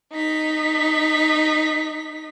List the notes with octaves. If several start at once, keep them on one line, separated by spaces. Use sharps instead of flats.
D#4 B6